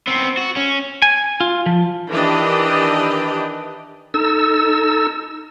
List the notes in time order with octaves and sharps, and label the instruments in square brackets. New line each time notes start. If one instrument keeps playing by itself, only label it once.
[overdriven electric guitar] B3 C4
F#4
C#4
[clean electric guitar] G#5
F4
F3
[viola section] D#3 E3 D4 G4 B4 D#5
[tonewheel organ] D#4 A4 E6